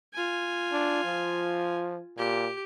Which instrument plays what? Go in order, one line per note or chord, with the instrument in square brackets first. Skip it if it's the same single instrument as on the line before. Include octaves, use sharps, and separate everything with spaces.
[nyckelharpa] F4 G#5
[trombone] D4
F3
[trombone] A#2 [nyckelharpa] G4